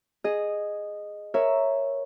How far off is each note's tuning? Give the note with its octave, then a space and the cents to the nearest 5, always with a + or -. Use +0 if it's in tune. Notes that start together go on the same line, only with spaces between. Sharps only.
G#4 +0 D#5 -10
A#4 +0 C#5 -5 E5 +0